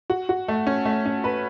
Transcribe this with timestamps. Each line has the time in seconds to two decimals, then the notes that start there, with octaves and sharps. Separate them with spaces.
0.10 F#4
0.29 F#4
0.48 A3
0.67 C#4
0.85 A3
1.06 C#4
1.24 B4